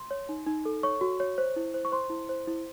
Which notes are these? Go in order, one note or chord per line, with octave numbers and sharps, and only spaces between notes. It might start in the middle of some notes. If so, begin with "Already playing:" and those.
Already playing: C6
C#5
D#4
D#4
A4
C#5 C#6
F#4
C#5
C5
E4
C5
C#6
C5 C6
E4
C5
E4